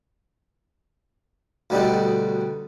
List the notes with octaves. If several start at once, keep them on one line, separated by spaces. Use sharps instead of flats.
D2 B2 G3 D4 D#4 A4